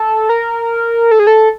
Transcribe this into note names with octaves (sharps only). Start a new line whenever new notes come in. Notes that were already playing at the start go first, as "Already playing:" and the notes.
Already playing: A4
A#4
A4
G#4
A4